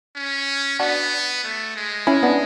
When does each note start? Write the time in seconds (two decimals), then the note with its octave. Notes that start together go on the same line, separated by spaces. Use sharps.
0.16 C#4
0.79 B3 D4 F#4
1.43 A3
1.76 G#3
2.07 C#4 E4
2.23 B3 D4